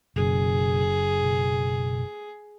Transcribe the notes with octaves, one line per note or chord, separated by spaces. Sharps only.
F#1 F#2 B2 G#4
B2